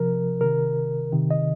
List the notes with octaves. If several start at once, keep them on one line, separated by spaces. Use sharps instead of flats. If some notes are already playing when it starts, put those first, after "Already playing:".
Already playing: C3 F3 A#4
C3 D#3 A#4
C3 D#3
D#5